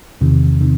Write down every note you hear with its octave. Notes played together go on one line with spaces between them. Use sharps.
E2 C3 D#3
C3 D#3